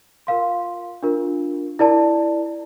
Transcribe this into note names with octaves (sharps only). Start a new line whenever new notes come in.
F4 A#4 F5 C6
D4 F4 A#4
E4 A#4 D5 A5